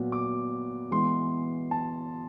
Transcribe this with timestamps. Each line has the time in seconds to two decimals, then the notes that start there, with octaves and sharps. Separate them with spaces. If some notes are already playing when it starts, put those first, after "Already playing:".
Already playing: A#2 F#3 B3
0.12 D6
0.91 E3 G#3 B3 C6
1.71 A5